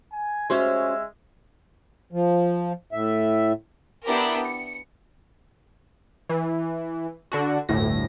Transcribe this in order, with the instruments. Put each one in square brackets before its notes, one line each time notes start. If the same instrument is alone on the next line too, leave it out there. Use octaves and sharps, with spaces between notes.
[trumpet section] G#5
[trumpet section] G#3 E5 [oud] C#4 F#4 C5
[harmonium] F3
A2 E5
[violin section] B3 D4 E4 G4 A#4
C#7
[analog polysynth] E3
D3 D4 F#4
G1 D2 A2 A#6